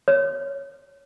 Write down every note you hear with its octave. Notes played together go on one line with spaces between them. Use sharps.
C#5